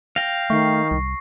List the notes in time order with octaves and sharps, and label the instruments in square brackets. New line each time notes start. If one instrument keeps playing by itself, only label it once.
[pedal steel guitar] F5 G5 [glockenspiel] A#6
[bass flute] D#3 [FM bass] A3 [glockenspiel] C#6 C7
[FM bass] C2